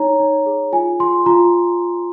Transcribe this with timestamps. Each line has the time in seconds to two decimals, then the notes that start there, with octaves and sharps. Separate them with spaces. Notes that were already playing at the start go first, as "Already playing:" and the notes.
Already playing: D#4 C#5 A#5
0.20 D#4
0.46 G#4
0.72 F4 G#5
0.99 F4 C6
1.26 F4 A#5